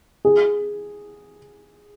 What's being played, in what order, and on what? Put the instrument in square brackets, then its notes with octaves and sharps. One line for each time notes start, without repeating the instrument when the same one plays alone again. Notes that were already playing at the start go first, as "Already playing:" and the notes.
[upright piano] G#4